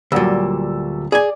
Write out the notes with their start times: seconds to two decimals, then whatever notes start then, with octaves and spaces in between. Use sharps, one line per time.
0.12 D2 A#2 F#3 G3 E6
1.12 G#4 D5 G#5